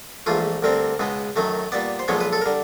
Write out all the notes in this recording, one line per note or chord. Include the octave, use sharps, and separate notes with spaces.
A#1 G#2 E3 A3 F4
D2 D3 G3 C4 A#4
C#2 B2 G#3 B3
F#2 D#3 F#3 A3
A#2 G3 B3 D5
C5
B1 A#2 F3 G#3 B3 C#5
B4
A4
A#4
D3 G3